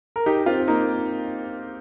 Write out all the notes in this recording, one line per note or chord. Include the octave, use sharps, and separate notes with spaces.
A#4
D#4 G4
C4 F4
A#3 D#4